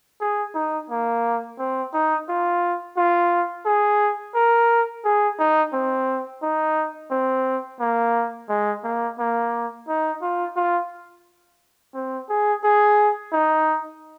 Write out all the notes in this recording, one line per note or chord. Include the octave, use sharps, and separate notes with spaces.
G#4
D#4
A#3
C4
D#4
F4
F4
G#4
A#4
G#4
D#4
C4
D#4
C4
A#3
G#3
A#3
A#3
D#4
F4
F4
C4
G#4
G#4
D#4